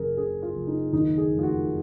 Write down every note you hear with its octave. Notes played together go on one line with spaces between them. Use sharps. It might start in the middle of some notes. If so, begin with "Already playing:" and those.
Already playing: F#1 F#2 G#4 A#4
C#3 G#4
F4
F#1
D#4
D#2 D#4
G#4
F1
F4
F#4